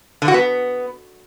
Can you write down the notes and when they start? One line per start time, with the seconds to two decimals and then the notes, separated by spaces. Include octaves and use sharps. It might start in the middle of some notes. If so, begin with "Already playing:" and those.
0.22 D3
0.28 F#4
0.34 B3